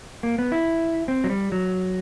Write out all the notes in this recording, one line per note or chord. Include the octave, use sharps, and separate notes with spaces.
A#3
B3
E4
C4
F#3
G3
F#3